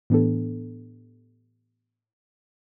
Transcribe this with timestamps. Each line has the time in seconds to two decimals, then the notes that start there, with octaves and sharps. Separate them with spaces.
0.10 A2 E3 B3 D4 G4 A4